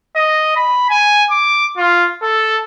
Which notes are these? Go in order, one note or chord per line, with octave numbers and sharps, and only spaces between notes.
D#5
B5
G#5
D6
F4
A4